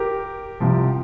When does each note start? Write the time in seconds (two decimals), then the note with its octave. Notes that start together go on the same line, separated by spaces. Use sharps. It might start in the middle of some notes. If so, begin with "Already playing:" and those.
Already playing: G4 A#4
0.60 C2 C3 F3